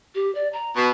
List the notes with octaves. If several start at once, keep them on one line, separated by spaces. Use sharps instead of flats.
G4
D5
A#5
B2